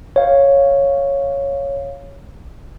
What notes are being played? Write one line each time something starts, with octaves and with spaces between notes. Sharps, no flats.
C#5 F5